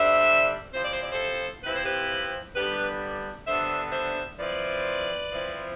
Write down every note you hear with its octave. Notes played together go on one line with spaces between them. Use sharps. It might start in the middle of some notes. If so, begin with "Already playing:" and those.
Already playing: D3 G3 D4 C5 E5
C3 F3 C4 E4 C5
D5
C5
D5
A4 C5
C3 F3 C4 E4 B4
C5
G4 B4
D3 G3 B3 D4 G4 B4
D3 G3 B3 D4 C5 E5
C5 E5
F3 C4 E4 B4 D5
F3 C4 E4